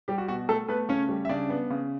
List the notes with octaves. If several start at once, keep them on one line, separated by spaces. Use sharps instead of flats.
G3 G4
F#4
B2 F#4
A3 A4
A3 B3 B4
C#3 C#4 C#5
G3
E5
C#3 D4 D5
B3
C#3